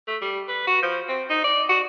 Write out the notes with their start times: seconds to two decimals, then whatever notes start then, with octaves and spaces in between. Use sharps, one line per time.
0.08 A3
0.22 G3
0.48 B4
0.67 F#4
0.83 F3
1.09 C4
1.30 D#4
1.44 D5
1.69 F#4